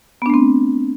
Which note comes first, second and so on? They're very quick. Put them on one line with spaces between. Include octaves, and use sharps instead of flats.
B3 D4 A3 C4